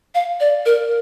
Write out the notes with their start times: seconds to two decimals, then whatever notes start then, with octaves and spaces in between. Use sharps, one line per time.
0.15 F5
0.40 D5
0.66 A#4